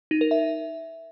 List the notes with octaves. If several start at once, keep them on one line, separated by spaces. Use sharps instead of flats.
D#4
A#4
E5